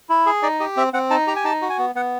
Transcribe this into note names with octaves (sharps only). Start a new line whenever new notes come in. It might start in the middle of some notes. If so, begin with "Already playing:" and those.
E4
G#4
D#4 D5
G4 D#5
C4 E5
C4 F#5
D#4 A5
G4 A#5
G#5
D#4 A5
F#4
G#5
B3
B3 F#5